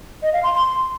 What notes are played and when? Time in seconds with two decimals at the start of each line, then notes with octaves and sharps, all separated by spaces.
0.23 D#5
0.33 F5
0.43 C6
0.54 C6